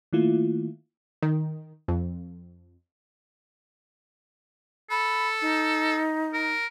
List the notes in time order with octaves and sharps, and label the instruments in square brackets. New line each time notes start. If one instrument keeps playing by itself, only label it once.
[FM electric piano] D#3 A3 A#3 E4 F4
[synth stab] D#3
F2
[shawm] A4 [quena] B5
[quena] D#4
[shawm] A#4